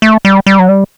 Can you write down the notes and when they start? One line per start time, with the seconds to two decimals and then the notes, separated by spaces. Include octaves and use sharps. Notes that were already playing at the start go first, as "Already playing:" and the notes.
0.02 A3
0.25 G3
0.46 G3
0.59 F#3
0.69 G3